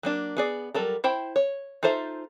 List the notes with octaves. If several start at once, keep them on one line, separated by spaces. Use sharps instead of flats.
F#3 A#3 D4
B3 G#4 D5
F#3 G3 A4 A#4
E4 C5 G5
C#5
D#4 F4 A4 C5 E5